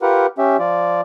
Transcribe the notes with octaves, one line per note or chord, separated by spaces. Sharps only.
F4 G4 A#4 B4 F#5
C#4 G4 E5
F3 F4 D5